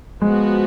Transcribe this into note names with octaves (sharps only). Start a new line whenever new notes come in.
F3 G#3 B3 F#4